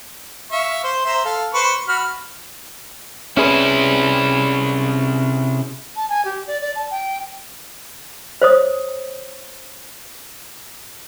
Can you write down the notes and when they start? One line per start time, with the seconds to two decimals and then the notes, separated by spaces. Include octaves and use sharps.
0.52 E5 F5 C#6
0.83 C5
1.05 C5 E5 A#5
1.25 A4 F5
1.54 B4 C5 C#6
1.88 F#4 B5 F6
3.37 C3 C#4 E4 G#4 B4
5.96 A5
6.09 G#5
6.25 G4
6.47 D5
6.61 D5
6.75 A5
6.91 G5
8.42 C5 C#5 D#6